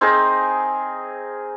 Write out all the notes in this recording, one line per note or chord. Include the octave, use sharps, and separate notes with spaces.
C4 D#4 G#4 A#4